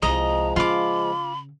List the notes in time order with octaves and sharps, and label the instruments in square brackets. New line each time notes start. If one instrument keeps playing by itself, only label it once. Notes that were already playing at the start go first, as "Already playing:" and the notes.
[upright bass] C2 [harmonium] F3 G#3 [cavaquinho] D#5 [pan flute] A#5
[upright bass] C#3 [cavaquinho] F4 D6 [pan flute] B5